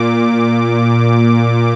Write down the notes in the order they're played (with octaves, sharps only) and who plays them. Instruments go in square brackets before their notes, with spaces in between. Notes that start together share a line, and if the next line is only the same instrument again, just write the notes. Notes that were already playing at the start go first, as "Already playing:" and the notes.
Already playing: [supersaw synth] A#2 D6